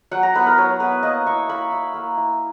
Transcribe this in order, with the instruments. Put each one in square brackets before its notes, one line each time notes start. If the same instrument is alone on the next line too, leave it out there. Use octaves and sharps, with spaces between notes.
[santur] F#3 F#5
A#5
B3 E4 B4
A#4
F#3 C#5
B3 E4 B4
A#3 D#5
E4 C#6
A#3 B5
E4
A#3
E4